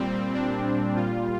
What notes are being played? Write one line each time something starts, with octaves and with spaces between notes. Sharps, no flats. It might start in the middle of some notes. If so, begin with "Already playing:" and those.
Already playing: A#2 G3 C4
D4
A#2 G3 F4